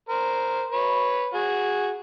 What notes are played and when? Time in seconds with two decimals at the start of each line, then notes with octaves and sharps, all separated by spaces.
0.09 A#4 C5
0.72 B4 C#5
1.34 F#4 G#4